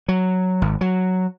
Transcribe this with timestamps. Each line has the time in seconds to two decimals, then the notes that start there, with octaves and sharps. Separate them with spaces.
0.08 F#3
0.62 G#1
0.81 F#3